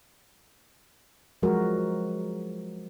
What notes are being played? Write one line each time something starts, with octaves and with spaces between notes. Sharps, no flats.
F3 F#3 G#3 F#4 A#4